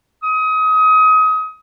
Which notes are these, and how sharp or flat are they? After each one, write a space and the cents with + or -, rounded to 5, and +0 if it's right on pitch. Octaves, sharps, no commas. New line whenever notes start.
D#6 +30